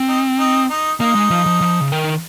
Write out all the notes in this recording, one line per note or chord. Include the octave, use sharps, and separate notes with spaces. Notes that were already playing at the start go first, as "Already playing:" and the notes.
Already playing: C4
D#4
D#4
D#4
A#3 D#4
G#3
F3
F3
F3
C#3
D#3